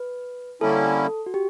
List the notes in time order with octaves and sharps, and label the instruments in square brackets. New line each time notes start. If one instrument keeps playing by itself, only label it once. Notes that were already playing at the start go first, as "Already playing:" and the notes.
Already playing: [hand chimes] B4
[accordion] D3 G3 A#3 C#4 E4 [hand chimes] A4
[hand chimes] F#4
G4